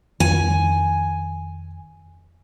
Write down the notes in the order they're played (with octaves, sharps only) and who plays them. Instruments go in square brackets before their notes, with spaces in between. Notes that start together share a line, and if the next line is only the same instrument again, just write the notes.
[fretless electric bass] F2 D#3 [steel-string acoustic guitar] G#5